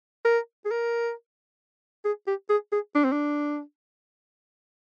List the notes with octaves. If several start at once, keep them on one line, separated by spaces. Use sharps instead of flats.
A#4
G#4
A#4
G#4
G4
G#4
G#4
D4
C4
D4